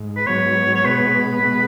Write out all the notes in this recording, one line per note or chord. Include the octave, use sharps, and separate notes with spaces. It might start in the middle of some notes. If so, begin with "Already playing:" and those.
Already playing: G#2
B4
G#2 F#3 B3 C#5
C#5
B2 G#3 B3 B4
B2 G#3 B3